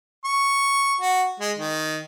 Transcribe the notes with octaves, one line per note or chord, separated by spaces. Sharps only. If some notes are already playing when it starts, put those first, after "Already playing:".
C#6
F#4
G#3
D#3